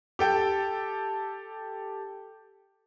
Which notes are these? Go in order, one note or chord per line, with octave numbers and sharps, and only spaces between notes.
G4 A4 G5